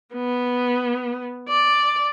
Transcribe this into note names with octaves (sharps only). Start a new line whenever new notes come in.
B3
D5